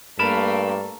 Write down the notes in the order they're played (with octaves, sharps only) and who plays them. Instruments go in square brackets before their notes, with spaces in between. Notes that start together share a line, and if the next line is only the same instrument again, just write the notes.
[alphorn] G2 [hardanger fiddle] A3 A#3 [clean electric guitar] A#4 A5 B5